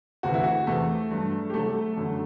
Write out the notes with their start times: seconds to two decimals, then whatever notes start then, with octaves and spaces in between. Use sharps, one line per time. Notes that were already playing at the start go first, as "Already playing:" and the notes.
0.23 D2 C3 E3 F#4
0.34 E4
0.44 F#4
0.67 E2 C3 E3 A3 A4
1.11 G2 F#3
1.50 G4
1.54 C2 C3 F#3 A3 A4
1.97 F#2 D3 F#3